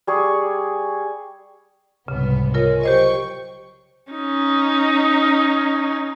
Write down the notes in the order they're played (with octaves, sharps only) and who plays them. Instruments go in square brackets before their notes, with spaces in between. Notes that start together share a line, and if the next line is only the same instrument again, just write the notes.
[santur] G3 G#4 C#6
[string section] C2 G#2 B3 [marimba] C#3
[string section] G#3 [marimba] F4 A#4 C#5
[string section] F#3 G5 C#6 [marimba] G4 C5 D#5
[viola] C#4 D#4